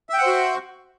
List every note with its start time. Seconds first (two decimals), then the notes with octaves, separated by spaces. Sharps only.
0.09 E5
0.14 G5
0.18 F#5
0.22 C5
0.27 F#4